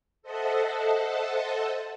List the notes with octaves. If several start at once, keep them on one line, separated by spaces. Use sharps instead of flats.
A4 C5 D#5 E5 F#5 A5